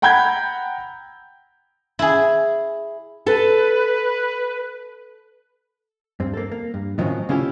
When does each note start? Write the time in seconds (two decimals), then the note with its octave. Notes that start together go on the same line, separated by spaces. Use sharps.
0.02 F#5 G5 A#5 B5 G6 G#6
1.99 E4 G#4
3.26 A4 B4 A5
6.20 G2 C4
6.34 A#3 A4
6.52 A#3
6.74 G2
6.98 A2 D#3 F3 F#3 C4 C#4
7.29 C#3 A#3 C#4 E4 F4 G4